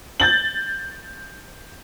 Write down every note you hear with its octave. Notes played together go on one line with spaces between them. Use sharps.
G6 A6 F#7